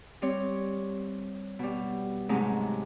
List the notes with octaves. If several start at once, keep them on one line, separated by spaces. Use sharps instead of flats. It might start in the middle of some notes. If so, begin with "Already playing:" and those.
G3 C4 C5 C#5
B2 G3
G#2 C3 F#3 G#3 A3